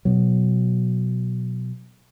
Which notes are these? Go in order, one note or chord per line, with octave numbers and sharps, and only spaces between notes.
B2 F#3